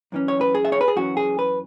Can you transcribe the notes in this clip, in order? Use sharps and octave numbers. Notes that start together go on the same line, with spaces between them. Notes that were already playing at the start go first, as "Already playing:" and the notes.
F#2 E3 C#4
C#5
B4
G#4
E5
C#5
B4
G#4
F#2 E3 C#4 F#4
G#4
B4